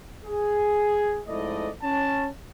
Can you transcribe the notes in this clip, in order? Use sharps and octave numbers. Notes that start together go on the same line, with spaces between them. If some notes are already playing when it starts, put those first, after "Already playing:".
G#4
F2 G#2 A3 E4 D5 D#5
C#4 A5